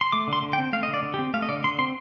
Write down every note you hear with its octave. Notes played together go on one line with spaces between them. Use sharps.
C6
A3 D6
D3 C6
D3
G5
C4
A3 F5
D3 D#5
D5
D3
G4
C4
A3 F5
D#5
D3 D5
D3 C6
C4 C6